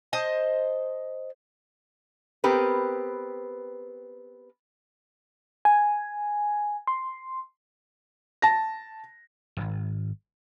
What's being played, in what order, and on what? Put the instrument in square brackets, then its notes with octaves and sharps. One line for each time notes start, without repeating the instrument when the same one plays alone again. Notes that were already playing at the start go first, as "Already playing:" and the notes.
[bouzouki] C5 D#5 A5
[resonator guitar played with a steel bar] B3 C4 G4 A#4 B4
[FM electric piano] G#5
C6
[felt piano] A5 A#6
[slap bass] D1 G#1